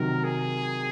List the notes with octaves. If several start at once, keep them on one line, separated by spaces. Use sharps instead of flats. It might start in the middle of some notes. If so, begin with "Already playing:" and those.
Already playing: C3 D#3 F#3 A#4
G#4